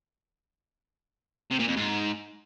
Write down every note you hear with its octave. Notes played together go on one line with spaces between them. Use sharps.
C3
A#2
F2
G#2